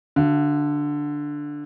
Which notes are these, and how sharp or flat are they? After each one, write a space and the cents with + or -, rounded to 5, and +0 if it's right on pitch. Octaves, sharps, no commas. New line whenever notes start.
D3 +0 F#4 +0 F5 -40